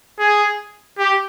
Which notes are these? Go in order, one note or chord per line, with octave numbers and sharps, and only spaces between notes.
G#4
G4